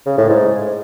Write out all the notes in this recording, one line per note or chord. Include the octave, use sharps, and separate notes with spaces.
C#3
A2
G#2